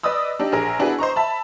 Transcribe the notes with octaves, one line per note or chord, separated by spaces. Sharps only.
B4 D5 D#5 D#6 E6
D4 D#4 G4
A#1 G#4 A#4
B3 D4 E4 F#4 G#4 B4
C5 D#5 A#5 C#6
E5 A5 B5